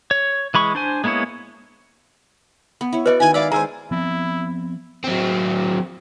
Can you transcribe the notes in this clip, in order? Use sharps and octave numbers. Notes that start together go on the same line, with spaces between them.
C#5
E3 G#3 B5 C#6
D4 C5 G#5
G#3 A#3 B3 E4 C#5
B3
E4 C#5
F#4 B4 C5 D5 D#5 C#6
D#3 E4 G#5
D5 E5 F5 B5 E6
G#3 C5 G#5 A#5 E6
F3 B3 C4 E4
F#3 C4